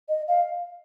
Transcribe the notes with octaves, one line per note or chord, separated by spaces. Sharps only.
D#5
F5